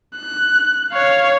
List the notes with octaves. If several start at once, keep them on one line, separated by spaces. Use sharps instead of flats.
F#6
C#5 F5